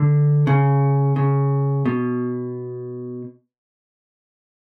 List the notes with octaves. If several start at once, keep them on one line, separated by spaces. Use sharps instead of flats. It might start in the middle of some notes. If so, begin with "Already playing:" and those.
Already playing: D3
C#3
C#3
B2